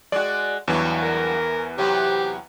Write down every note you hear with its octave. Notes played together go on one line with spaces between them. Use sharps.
G#3 F#4 D5
E2 G2 E3 F#3
A#4
C3 F#3 B3 G4